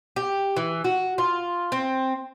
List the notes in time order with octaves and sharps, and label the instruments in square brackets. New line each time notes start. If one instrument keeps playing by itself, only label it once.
[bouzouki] G4
E3
F#4
F4
C4